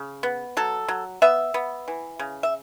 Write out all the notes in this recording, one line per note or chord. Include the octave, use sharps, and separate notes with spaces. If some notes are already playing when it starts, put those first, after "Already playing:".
Already playing: C#3
B3
F#3 A4
F#3
B3 E5
B3
E3
C#3
E5